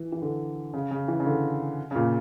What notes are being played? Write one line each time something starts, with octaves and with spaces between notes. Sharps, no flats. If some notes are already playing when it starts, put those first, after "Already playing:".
Already playing: E3
E3
D3
C#3
C#3
E3
C#3
D3
C#3
A#2